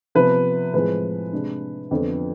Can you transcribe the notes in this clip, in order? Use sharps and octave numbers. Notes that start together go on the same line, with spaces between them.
C3 F3 B3 B4
A2 F3 G#3 C4 B4
C3 G#3 D4
F2 D3 F3 B3